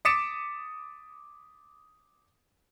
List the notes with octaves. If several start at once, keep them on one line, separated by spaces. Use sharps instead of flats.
D6 D#6 A6 B6 C#7 E7